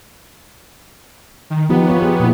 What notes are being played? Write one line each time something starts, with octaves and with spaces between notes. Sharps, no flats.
D#3
F3 B3 D#4 G4
F4 B4 C#5
G4 G#4
A#2 E4